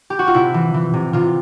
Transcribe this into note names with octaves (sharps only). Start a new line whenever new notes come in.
G4
F#4
F4
C3 E4
E3
E3
C3
C3 F4